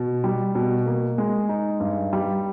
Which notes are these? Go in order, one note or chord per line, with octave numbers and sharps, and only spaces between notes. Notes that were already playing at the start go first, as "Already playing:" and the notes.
Already playing: B2
G3
B2
A#3
G#3
D#4
G2
G3